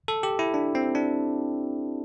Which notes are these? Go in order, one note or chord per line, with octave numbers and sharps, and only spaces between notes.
A4
G4
E4
D4
C4
D4